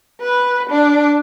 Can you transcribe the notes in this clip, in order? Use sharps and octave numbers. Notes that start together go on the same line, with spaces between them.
B4
D4